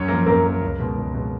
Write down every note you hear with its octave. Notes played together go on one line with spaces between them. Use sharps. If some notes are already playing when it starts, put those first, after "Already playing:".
Already playing: F#2 C#4 C#5
F3 A#3 A#4
F#2 A#3 A#4
F3 A#3
C#2
B2 G#3
C#2
B2 G#3